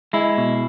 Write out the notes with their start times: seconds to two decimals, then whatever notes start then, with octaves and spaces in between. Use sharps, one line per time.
0.13 G#3 E4
0.37 B2